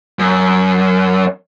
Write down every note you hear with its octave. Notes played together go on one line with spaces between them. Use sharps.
F#2